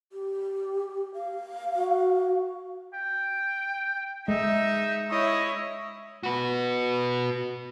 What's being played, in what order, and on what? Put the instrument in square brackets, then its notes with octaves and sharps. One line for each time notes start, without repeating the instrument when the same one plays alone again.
[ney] G4
F5
[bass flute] F#4
[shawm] G5
[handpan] G#3 [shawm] D#4 [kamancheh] E5
[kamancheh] E4 C#5 [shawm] D#5
[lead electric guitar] F#4 B4